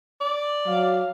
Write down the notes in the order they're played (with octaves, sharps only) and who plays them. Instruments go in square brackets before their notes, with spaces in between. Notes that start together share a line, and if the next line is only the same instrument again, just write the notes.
[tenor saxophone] D5
[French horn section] F#3 [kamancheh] F5